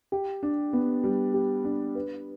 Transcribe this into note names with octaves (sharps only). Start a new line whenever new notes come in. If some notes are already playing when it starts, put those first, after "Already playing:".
G4
D4
B3
G3
G4
D4
B4